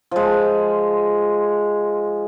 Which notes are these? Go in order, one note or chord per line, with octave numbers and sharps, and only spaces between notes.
F3 G#3